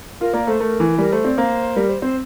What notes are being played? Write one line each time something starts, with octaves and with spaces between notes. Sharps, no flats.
F4 A#4
A#3 D5
A3 C5
A3 A#4
E3
G3 A#4
A3 C5
C4 D5
A#3 C5
G3 A#4
C5
C4 C5